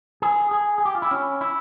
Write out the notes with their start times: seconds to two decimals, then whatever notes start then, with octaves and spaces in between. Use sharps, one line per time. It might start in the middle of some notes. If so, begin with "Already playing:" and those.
0.22 G#4
0.51 G#4
0.78 G#4
0.85 G4
0.95 F4
1.02 E4
1.11 C#4
1.41 E4